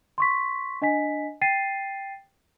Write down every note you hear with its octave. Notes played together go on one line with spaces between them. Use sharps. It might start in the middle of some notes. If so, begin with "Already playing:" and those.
C6 C#6 B6
D4 D#5 G#5 B6
G5 A6 C7 D#7